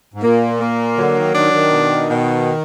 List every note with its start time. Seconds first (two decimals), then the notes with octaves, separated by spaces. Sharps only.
0.14 G#2
0.22 A#2 A#3
0.60 A#3
0.97 D3 F#3
1.16 D#3
1.35 D#3 D4
1.53 D#3
1.72 B2
2.10 B2